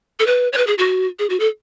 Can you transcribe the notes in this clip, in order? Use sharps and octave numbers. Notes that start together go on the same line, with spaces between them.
A4
B4
C#5
B4
G#4
F#4
G#4
F#4
A4